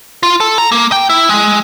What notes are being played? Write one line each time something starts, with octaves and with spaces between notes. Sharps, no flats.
F4
A4
A#5
A#3
G5
E4
G#3